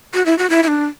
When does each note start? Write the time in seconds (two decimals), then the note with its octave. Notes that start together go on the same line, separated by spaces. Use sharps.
0.14 F#4
0.26 E4
0.38 F#4
0.50 E4
0.63 E4
0.68 D4